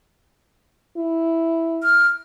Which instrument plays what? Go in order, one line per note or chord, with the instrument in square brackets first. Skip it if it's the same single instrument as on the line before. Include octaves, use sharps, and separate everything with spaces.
[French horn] E4
[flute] F6